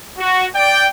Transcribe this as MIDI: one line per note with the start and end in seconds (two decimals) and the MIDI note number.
0.18 0.46 66
0.54 0.87 74
0.54 0.87 79